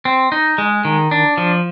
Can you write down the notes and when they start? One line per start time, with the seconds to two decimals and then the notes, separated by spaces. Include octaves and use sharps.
0.05 C4
0.32 D#4
0.58 G#3
0.85 D#3
1.11 D4
1.37 F3